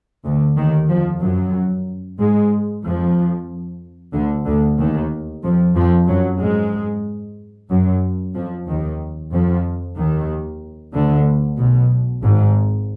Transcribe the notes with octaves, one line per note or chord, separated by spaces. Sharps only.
D2 D3
D#2 D#3
F2 F3
F#2 F#3
G#2 G#3
F2 F3
D2 D3
D2 D3
D#2 D#3
F2 F3
F2 F3
F#2 F#3
G#2 G#3
F#2 F#3
F2 F3
D#2 D#3
F2 F3
D#2 D#3
D2 D3
B1 B2
G#1 G#2